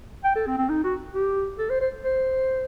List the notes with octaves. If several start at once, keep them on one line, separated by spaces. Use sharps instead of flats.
G5
A4
C4
C4
D#4
F#4
G4
A4
C5
C5
C5